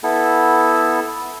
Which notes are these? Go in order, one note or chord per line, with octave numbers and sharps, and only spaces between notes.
B3 E4 A4